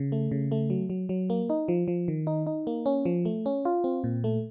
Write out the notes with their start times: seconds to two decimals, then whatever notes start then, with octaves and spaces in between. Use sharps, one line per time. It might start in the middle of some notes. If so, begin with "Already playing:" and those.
Already playing: C#3
0.12 A3
0.31 C#3
0.52 A3
0.70 F#3
0.90 F#3
1.09 F#3
1.30 A#3
1.50 D#4
1.68 F3
1.88 F3
2.08 D#3
2.27 D#4
2.47 D#4
2.67 A#3
2.86 C#4
3.05 F3
3.25 A3
3.46 C#4
3.65 F4
3.84 C4
4.04 A#2
4.24 A3